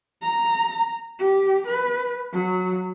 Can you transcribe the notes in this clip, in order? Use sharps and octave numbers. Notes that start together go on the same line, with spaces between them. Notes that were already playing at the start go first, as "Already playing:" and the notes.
A#5
G4
B4
F#3